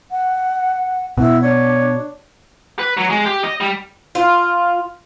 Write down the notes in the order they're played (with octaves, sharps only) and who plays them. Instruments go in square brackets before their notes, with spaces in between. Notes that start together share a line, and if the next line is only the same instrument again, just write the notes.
[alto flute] F#5
[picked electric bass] B2 [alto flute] E4
[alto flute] D4 [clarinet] C#5
[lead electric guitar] B4
F#3
G#3
G4
D#5
G3
[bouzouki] F4